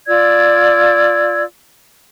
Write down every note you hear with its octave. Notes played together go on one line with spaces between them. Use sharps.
F4 D5 E6 G#6